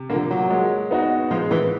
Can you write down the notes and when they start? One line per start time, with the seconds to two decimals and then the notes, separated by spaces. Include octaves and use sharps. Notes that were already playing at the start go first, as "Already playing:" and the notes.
Already playing: C3
0.10 D3 A#3
0.14 F3
0.31 F#3
0.50 G#3
0.91 B3 D#4 F#4
1.31 F3 G#3
1.51 E3